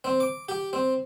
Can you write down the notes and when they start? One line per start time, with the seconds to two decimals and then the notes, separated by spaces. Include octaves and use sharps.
0.04 C4
0.20 D6
0.49 G4
0.73 C4